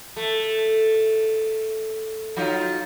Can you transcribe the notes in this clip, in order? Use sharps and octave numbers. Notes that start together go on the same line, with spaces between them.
A3
F#3 D#4 F4